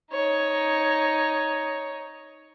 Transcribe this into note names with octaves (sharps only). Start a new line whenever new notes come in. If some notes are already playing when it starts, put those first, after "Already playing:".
D#4 C#5